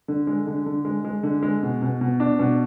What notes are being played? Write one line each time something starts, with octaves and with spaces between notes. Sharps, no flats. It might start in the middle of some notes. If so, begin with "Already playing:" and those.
D3
G#3
D3
D3
G#3
G#3
D3
G#3
B2
B2
B2
D4
B2